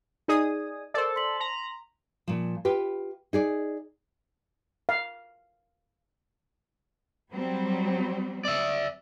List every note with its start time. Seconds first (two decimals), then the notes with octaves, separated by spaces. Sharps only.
0.28 D#4 G#4 D5 D#6 G#6
0.94 A4 A#4 C5 D5
1.16 C6 B6 F#7
1.40 A#5
2.28 A#2 F3
2.65 F4 G4 B4
3.33 D#4 G#4 D5
4.89 F5
7.32 F#3 G3 C4
8.45 D5 E5